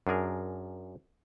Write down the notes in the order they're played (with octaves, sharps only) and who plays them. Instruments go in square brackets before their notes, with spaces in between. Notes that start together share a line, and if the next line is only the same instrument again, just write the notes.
[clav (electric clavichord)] F#2 D4 G#4 A#4